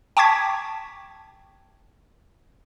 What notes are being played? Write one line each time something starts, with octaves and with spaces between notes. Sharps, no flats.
G5 A5 C#6 D6 G#6 B6